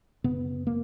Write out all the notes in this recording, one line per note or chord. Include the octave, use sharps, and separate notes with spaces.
F#2 C#3 B3
A#3